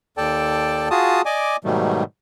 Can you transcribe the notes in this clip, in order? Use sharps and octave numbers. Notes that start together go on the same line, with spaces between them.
D#2 A4 D5 G5 A5
F4 F#4 G#4 A5 D#6
D5 D#5 G#5 D6
G#2 B2 D#3 F#3 G3 A3